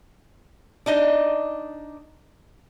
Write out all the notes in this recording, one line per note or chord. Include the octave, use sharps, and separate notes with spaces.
D4 D#4 D#5